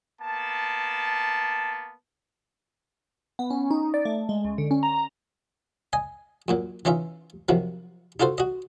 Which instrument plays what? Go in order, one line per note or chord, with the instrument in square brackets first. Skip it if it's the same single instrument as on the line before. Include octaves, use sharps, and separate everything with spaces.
[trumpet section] A#3 B3 A5
[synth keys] B3
C#4
D#4
D5
A3
G#3
C#2
D3
C#4
A#5
[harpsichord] D#5 G#5
F#2 A#2 F#3
E3 C#4 D#4 F4 E5
C3 D#3 F3 F#3
D#4 F4 F#4 A4 C5
F#4 D#5